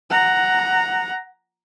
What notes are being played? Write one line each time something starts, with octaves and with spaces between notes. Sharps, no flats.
F#5 A#5